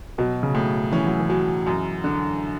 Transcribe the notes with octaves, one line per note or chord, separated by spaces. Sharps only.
B2 F#3
C#3
A2
E3 C#4
F#3
E3
F#3
F#2
D3